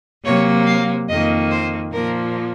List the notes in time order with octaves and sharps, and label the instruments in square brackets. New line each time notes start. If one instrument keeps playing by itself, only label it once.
[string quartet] C3 F#3 A#3 C#5
F5
F2 D#3 A#3 D#5
C5
A#2 F3 A#3 A#4